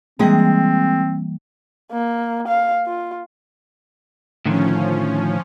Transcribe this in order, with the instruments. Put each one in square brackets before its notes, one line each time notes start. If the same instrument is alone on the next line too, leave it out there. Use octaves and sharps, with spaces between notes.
[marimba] E3 G3 A#3 [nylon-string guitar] G#3 G#4 [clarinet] C4
[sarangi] A#3
F5
F4
[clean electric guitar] A2 D3 D#3 [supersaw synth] F3 C#4